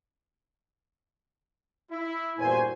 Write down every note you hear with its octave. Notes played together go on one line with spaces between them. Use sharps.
E4
E2 G2 A#2 F#4 C5 G#5